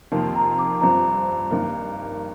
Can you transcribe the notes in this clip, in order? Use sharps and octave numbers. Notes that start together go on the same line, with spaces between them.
F2 C3 D#3 A#3 A5
A#5
D6
G2 F3 C4 A#5
G2 D#3 A#3